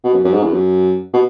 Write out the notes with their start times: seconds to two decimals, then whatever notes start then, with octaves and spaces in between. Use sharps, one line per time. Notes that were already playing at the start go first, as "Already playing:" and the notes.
0.04 B2
0.14 F#2
0.24 F#2
0.33 G#2
0.43 E2
0.53 F#2
1.14 B2